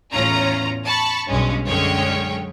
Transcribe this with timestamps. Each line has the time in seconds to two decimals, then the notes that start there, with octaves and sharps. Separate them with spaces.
0.13 E2 A2 C#4 F4 A#5
0.86 A5 B5 C#6
1.29 B1 G2 G#3 C#4
1.66 F#2 D3 G#3 C#4 C#5 G5